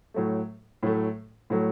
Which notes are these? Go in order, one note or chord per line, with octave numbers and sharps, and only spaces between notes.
A2 F#3 A3
A2 F#3 A3
A2 F#3 A3